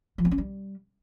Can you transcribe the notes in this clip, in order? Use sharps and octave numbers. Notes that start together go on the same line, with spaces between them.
F3
B3
C#4
G3